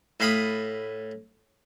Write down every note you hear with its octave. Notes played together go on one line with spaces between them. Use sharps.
A2 F5 B5 D#6